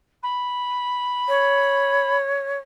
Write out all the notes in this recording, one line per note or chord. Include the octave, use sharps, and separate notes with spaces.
B5
C#5